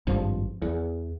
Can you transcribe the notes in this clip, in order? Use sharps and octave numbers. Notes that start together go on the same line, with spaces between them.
G#1 G2 F3
E2